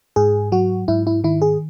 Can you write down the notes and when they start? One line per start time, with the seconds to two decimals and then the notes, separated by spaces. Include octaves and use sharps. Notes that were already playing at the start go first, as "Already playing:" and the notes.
0.16 G#2 G#4
0.52 F#3 F#4
0.88 G#2 E4
1.07 E4
1.24 D#3 E4
1.42 G#4